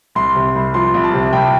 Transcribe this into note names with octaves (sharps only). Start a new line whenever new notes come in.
C2 C6
C3
C2
F3 C6
C2
A5
C3
C2 G5